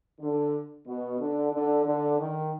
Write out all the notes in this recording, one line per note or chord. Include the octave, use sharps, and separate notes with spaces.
D3
B2
D3
D3
D3
D#3